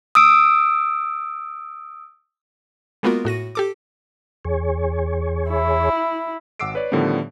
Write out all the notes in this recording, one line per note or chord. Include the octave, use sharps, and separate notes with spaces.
D#6 E6 D7
G#3 A#3 B3 F4 F#4 A#4
A2 F#4 A#6 D#7
G4 A4 D6
E2 G#4 C#5
E4
G#1 F#5 D6 E6 C7 D7
B4 C#5 D5
A2 D3 D#3 F3 G3 B3